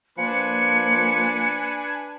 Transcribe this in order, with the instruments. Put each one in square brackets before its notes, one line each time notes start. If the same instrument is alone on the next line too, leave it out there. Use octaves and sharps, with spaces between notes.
[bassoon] F3 [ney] A#3 [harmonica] D4 B4 G#5 [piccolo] C#7